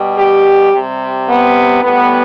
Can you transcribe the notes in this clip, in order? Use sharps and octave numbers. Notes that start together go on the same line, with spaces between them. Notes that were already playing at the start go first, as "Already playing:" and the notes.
Already playing: B2 G3
G4
C3 G3
B3
A2 G3 B3